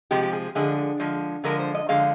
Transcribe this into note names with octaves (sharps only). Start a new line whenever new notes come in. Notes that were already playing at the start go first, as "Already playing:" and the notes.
C3 F3 G#3 G4
G4
G#4
D3 F3 G#3 G#4
D3 F3 G#3
D3 F3 G#3 A#4
C5
D#5
D3 F3 G#3 F5